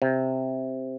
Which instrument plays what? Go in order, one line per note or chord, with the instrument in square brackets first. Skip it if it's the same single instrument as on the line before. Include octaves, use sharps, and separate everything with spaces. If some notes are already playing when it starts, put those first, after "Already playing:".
[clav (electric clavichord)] C3